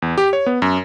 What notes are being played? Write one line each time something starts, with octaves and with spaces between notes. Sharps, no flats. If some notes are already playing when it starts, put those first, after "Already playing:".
E2
G4
C#5
B3
F#2